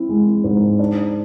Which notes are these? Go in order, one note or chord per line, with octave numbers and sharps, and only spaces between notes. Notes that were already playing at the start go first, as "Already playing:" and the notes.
Already playing: C4 E4
G#3
G#2
D4